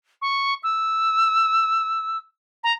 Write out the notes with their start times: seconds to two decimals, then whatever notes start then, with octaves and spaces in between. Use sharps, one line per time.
0.22 C#6
0.63 E6
2.64 A#5